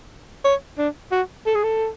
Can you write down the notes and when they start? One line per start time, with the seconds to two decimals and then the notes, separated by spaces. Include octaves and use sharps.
0.45 C#5
0.78 D4
1.12 F#4
1.46 A4
1.55 G#4
1.64 A4